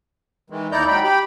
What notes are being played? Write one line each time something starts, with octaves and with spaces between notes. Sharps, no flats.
D#3 E3 G#3
D#2 D#4 E4 D5 A#5 G6
F#3 G#3 D#4 G5 B5
G4 G5 B5